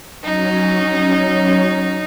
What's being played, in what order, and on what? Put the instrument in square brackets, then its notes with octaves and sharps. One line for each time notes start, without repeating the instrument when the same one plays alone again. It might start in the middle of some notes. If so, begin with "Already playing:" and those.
[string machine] F#3 C#4 [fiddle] D#4